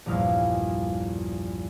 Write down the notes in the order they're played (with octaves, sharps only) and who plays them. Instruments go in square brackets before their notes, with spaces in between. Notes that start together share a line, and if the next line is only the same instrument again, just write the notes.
[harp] A#1 E2 G2 F5 D#6